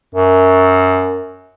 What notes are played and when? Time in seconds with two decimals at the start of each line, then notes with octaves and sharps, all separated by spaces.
0.15 F#2